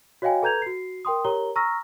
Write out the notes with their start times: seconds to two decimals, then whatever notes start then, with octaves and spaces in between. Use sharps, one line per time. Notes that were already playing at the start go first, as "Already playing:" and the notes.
0.22 F#4 C#5 D#5 F5 G5 G#5
0.43 A4 B4 A#5 G6 G#6 F7
0.62 F#4 C7
1.05 A#4 G5 C6 D#6
1.25 G4 A#4 C#5 A#5 G7
1.56 A#5 C#6 E6 F6 A#6